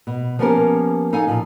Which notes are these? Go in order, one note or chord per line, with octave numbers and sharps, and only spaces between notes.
B2
F3 A#3 B3 C#4 G4 A#4
D#4 A4 F5 G#5
A#2 F3